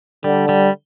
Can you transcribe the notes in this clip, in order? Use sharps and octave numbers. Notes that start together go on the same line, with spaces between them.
D3 G3
G3